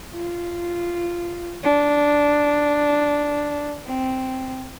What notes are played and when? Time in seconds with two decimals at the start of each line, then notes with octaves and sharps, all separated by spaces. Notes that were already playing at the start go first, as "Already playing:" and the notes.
0.15 F4
1.63 D4
3.86 C4